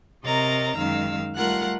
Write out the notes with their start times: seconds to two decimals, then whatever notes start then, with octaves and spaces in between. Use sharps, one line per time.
0.24 C3 A#4 C#5 D#5 A#5 A6
0.77 F#2 D#3 G#3 F5 E6
1.36 G3 A3 F4 A#4 F#5 F#6